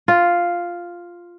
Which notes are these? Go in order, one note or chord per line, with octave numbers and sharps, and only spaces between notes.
F4